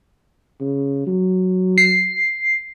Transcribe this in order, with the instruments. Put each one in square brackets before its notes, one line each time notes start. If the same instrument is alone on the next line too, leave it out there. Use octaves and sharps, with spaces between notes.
[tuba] C#3
F#3
[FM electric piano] C7